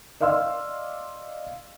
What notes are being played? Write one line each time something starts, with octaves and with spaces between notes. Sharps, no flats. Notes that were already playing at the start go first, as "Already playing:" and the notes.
D5 D#5 F5 C6 E6 F6